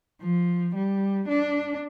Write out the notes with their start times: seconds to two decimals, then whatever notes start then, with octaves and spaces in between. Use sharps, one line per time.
0.22 F3
0.75 G3
1.29 D4